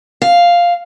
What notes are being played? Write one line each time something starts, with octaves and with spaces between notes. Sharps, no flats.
F5